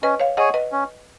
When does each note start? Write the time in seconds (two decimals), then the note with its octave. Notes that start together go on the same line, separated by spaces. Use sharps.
0.03 C#4 B4 D#5
0.20 C#5 F5
0.37 G#4 C#5 D#5 F#5 G#5
0.54 B4 D#5
0.72 C#4